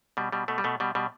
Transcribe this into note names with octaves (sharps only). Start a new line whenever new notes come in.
B2 G3
B2 G3
B2 A3
G3
B2 A3
B2 G3
B2 G3